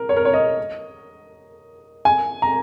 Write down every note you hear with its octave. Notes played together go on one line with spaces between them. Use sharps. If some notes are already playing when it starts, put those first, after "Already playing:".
Already playing: A#4
C#5
A#4
C#5
D#5
G#5
A#5